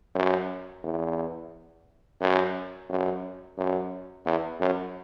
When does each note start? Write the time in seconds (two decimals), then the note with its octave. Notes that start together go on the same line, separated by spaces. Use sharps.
0.15 F#2
0.83 E2
2.21 F#2
2.90 F#2
3.58 F#2
4.26 E2
4.60 F#2